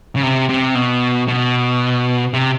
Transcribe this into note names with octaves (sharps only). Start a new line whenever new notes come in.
C#3
C3
C3
B2
B2
C3